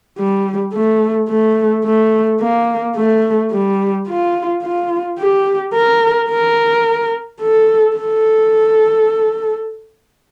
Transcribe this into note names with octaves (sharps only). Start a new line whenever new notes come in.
G3
A3
A3
A3
A#3
A3
G3
F4
F4
G4
A#4
A#4
A4
A4